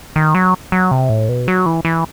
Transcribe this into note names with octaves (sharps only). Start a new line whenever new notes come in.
D#3
F#3
F#3
C3
A2
B2
F#3
E3
E3